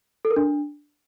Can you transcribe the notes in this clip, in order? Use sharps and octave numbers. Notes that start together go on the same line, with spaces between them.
A4
A#4
D4